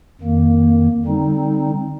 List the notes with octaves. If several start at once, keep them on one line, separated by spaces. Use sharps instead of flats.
F2 D#3 A#3
D3 G3 C4 D#4